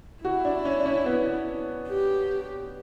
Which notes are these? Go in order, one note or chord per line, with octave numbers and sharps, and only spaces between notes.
E4 F#4
D4
C#4
D4
C#4
B3
G4